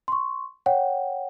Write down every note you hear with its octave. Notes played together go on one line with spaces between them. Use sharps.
C6 C#6
C#5 F#5 G5